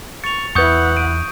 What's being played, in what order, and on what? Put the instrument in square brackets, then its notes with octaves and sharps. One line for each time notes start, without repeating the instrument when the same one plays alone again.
[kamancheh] C#6 [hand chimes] A6 [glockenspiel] C#7 F7
[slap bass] E2 [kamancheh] E4 F#5 [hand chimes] B4 C#7 [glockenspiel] C#6 D#6 G6
[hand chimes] D7 [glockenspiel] D#7